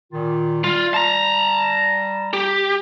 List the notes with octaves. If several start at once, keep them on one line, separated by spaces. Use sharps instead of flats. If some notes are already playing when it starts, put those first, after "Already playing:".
A#2 D#3 F4
G3 F4
A5 A#5
G4